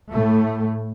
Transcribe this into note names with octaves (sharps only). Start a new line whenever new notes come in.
A2 A3